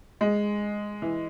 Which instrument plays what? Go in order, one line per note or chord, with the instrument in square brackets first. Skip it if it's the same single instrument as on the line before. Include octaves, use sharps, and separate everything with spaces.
[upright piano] G#3
E3